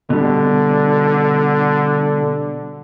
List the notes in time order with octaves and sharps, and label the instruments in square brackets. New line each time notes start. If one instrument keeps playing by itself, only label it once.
[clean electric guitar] B2 G3 [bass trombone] D3